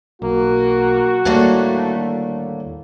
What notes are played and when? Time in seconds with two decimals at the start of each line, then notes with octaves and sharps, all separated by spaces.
0.22 B1 A#3 F#4
1.25 D#2 A2 D3 G3 A3 A#3